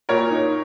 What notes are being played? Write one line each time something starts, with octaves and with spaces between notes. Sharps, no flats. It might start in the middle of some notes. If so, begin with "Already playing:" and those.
A#2 A#4 C#5
D#4